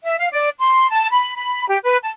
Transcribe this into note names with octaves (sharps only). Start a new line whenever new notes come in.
E5
F5
D5
C6
A5
B5
B5
G4
B4
A5